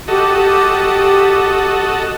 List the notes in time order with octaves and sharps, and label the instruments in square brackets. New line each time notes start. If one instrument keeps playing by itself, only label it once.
[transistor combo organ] F#4 A4 D#5 [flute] G4